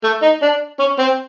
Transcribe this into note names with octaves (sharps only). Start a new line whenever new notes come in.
A3
D#4
D4
C#4
C4